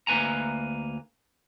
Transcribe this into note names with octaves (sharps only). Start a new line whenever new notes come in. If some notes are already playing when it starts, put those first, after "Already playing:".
D2 A#3 B4 G#5 A#5